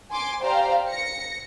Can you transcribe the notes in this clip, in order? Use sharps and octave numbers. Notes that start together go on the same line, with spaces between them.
G#5 C6 D6
G4 C5 D5 F5 G5 A#5
A#6 C#7